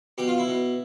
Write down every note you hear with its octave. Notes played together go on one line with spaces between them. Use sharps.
B2 G4
F4
E4
B2